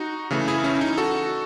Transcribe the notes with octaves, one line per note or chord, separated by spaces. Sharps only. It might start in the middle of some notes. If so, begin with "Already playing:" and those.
Already playing: D#4 F#4
C#3 E3 A3
E4 G#4
C#4 E4
C#4
D#4
F#4 A4